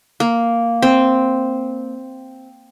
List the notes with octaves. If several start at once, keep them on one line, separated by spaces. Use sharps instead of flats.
A#3
C4